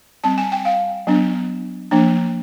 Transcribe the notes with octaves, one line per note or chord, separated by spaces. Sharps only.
G3 C4 A5
G#5
G5
F5
F#3 B3 D4
F3 A#3 D4